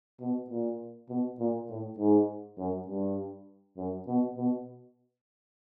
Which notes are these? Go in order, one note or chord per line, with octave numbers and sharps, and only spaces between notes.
B2
A#2
B2
A#2
A2
G#2
F#2
G2
F#2
B2
B2